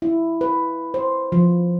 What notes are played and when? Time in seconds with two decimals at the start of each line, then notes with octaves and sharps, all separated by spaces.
0.02 E4
0.41 B4
0.94 C5
1.32 F3